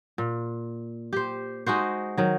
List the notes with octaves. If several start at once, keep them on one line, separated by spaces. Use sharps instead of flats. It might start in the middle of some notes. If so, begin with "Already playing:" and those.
A#2
G4 C5
G#3 D#4 F#4 C5
D#3 F#3